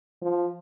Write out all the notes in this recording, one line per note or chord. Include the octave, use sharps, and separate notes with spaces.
F3